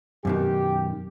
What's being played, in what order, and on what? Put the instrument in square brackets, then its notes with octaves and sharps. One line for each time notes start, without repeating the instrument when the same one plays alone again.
[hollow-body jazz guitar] F#2 B2 D#3 [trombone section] G4